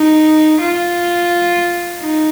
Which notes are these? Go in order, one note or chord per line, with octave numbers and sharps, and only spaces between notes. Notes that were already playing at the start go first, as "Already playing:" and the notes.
Already playing: D#4
F4
D#4